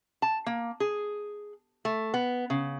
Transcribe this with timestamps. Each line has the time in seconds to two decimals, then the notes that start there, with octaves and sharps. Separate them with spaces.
0.22 A5
0.46 A#3
0.80 G#4
1.85 A3
2.14 B3
2.50 C#3